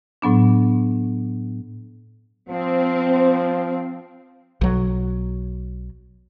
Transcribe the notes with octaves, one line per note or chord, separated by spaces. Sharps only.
A2 F#3 B3 D4
F3 C4
B1 F#3